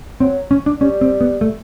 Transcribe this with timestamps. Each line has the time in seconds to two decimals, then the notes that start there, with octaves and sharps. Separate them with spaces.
0.20 F#3 C4
0.51 C#4
0.66 D4
0.81 G3 C#4
1.01 C4
1.21 B3
1.41 A3